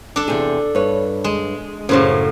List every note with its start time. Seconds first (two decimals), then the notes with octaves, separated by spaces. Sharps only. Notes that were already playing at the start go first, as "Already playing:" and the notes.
0.16 D4 A4
0.28 E2 C3 G#4
0.75 G2 B4 C#5
1.24 G#3
1.89 F#2 A2 C#3 C#4 G#4 C5